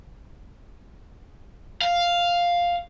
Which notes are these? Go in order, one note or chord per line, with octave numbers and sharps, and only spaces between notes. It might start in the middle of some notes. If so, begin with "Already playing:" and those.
F5